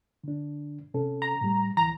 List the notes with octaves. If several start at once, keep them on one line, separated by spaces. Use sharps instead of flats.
D3 D4
C3 C#4 A4
A#5
A2 G3
D2 E3 A#5